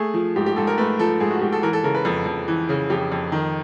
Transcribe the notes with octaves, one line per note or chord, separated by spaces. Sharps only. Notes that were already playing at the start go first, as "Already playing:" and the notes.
Already playing: A3 G#4
F3
G#2 G4
G4
G#2 A4
A#4
A3 B4
F3 A4
G#2 G#4
F#4
G#2 G4
A4
E3 A#4
A4
C#3 A#4
B4
F2 A4
F2
E3
C#3
F2 G4
F2
D#3